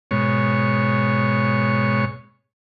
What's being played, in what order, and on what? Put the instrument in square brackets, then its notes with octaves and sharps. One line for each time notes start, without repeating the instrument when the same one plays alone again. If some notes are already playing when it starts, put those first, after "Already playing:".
[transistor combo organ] G#2 B2 C#5